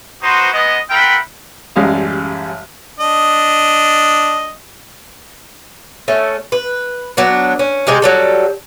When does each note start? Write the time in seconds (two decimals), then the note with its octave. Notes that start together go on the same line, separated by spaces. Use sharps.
0.22 B3 D#4 F#4 B4 C5
0.53 G#3 B3 D#5
0.90 F4 A#4 E5 F#5 G5 B5
1.76 A1 F#2 G3 G#3 F5 D#6
3.00 D4 D#5
6.08 A3 C#4
6.52 B4
7.17 F#3 B3 D4
7.59 C#4
7.87 C3 G#3 G4 G#4
8.02 F#3 G3 A4